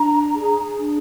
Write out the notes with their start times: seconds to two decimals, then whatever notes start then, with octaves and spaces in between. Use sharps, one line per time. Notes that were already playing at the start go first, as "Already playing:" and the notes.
Already playing: D4 A#5
0.34 G#4
0.79 D4